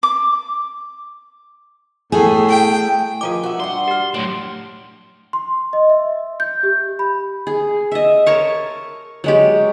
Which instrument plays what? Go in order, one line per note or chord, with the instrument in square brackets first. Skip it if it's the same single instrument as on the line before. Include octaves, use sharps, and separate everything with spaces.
[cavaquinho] D6
[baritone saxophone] A2 [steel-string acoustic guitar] A3 G#4 G#5
[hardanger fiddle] G5
[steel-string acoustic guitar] D#3 F3 G#4 [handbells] A#4 A#5 D6
[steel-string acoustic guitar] F#4 E5
[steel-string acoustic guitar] G2 A4 F#5 [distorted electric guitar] C6
[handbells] G4 F6
[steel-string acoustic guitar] A2 [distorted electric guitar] F#3 D4
[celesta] C6
D#5
E5
G6
G4
B5
[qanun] G#4
D#5 E5
A#4 C#5 A5 C#6
F#3 G#3 G4